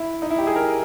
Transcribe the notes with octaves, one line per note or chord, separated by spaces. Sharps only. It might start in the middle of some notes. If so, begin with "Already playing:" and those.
Already playing: E4
D#4
E4
G4
G#4
A#4